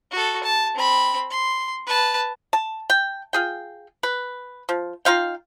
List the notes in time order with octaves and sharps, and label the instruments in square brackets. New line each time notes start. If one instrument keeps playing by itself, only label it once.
[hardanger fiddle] F#4 A4
A5
C4 B5
C6
B4 A5
[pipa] A5
G5
F4 G#4 G5
B4
F3
D#4 F4 F5 G5